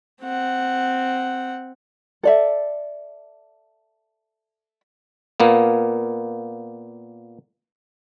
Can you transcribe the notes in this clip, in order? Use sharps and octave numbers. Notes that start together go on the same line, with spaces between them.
C4 F#5
A4 D5 E5
A#2 A#3 B3